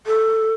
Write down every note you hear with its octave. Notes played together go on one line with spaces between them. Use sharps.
A4